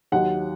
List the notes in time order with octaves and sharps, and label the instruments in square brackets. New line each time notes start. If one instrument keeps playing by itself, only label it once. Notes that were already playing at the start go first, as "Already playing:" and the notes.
[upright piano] D#2 D#3 F#3 F#5